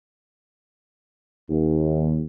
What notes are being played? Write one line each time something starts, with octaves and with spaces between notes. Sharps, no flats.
D#2